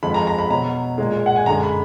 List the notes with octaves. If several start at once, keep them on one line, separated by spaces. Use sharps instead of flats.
F2 F3 G#3 B5
A#5
A#5
B5
B2 F#3 A#5
A#2 G#3
F#5
G#5
F#2 D3 G#3 A#5
B5